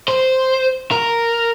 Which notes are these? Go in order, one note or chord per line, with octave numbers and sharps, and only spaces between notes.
C5
A#4